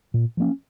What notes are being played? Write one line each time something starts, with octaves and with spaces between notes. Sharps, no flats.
A#2
F3 A#3 C#4